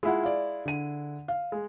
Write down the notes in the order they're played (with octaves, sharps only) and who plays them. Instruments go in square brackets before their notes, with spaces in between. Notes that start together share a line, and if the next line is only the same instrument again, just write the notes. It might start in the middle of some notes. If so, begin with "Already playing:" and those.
[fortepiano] G#3 E4 [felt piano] F4 F#5
[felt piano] D5 F5
D3 D#7
F5
[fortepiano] G#3